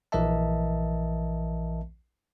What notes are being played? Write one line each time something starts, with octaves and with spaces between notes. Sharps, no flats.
A#1 E3 A#4 D#5 E5 A5